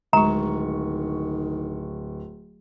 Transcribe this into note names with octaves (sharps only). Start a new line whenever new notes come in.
D1 D#3 G#3 A#5 C#6